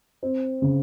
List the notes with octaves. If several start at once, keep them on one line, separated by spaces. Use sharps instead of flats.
C4
C#3